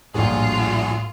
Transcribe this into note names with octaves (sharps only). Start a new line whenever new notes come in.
D#1 A#1 A2 D4 F4 F#4 G#4